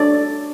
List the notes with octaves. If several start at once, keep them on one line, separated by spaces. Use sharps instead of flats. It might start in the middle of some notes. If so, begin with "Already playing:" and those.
Already playing: D4 A4 C#5 D5